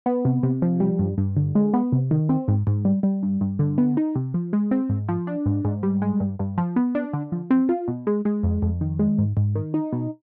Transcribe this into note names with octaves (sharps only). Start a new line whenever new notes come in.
B3
C3
C3
F3
G3
G2
G2
D3
G#3
B3
C3
D#3
C4
G#2
G#2
G3
G3
G2
G2
D3
B3
D#4
C3
F3
G#3
C4
G#2
F3
D4
G#2
G#2
G3
G#3
G2
G2
F3
B3
D4
D3
F3
C4
F4
B2
G#3
G#3
F2
F2
D#3
G#3
G#2
G#2
D#3
D#4
B2